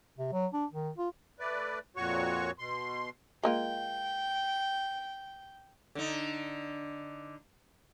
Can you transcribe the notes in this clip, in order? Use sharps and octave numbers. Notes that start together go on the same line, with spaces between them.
C3
F#3
D4
D#3
F4
A3 B4 D5
F2 A#2 F#4 C#5 C#6
B2 C6
G#3 A#3 F4 G5
D3 D#4